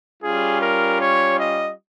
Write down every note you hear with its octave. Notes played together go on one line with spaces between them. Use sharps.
G3 C#4 F4 G#4
A#4
C#5
D#5